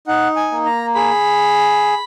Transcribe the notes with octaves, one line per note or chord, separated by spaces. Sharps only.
D#4 F#5
G#5
A#3
A#5
G#4 B5